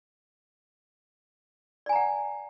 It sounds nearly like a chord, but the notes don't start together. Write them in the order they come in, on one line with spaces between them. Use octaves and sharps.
D5 G#5 A#5 F#5